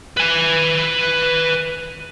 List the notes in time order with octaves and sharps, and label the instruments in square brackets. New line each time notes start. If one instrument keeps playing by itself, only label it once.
[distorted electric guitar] B4 G#5